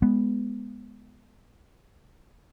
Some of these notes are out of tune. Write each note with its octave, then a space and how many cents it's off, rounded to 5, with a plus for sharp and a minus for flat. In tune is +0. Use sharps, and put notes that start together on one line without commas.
G#3 +0 B3 +0